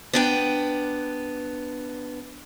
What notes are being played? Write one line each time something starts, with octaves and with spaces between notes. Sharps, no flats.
B3 D4 G5